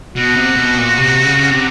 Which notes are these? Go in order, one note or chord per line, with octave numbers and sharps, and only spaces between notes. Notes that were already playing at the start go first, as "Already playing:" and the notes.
B2 F#4
C3
B2
A#2
C3
C#3
C3